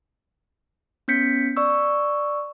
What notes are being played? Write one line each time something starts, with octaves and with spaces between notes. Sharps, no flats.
B3 C#4 G6 B6 C#7
D5 C#6 E6